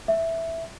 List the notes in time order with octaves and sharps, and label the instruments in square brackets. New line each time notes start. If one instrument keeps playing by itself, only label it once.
[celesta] E5